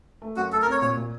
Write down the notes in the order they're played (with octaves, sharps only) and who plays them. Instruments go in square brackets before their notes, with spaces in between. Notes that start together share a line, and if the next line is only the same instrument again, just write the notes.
[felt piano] A3
[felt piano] F#2 [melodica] F#4
[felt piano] A3 [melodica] A4
[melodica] A#4
[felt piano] C4 [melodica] C#5
[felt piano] A#2 [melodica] C#5
[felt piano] A#2